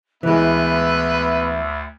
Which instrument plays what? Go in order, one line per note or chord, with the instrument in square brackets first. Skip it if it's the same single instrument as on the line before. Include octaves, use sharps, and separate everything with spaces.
[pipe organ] D2 [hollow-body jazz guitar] E3 G#3 [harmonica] B3 [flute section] E5 B5 E6